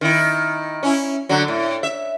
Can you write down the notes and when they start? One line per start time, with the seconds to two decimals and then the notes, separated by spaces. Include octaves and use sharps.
0.01 D#3 E4
0.83 C#4 E4
1.29 D3 F#3
1.48 A2
1.83 E5